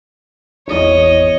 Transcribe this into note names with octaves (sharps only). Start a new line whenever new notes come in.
G#1 E2 C#5 D#5